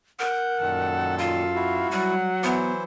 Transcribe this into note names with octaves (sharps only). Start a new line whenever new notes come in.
A#4 F#5 G6
F#2 A#2 D#3 A4
F4 F5
E4 F#4
F#3 G3 F#5
E3 B3 E4 C5